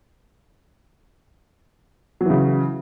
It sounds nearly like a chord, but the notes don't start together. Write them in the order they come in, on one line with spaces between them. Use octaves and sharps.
F#3 E3 C#3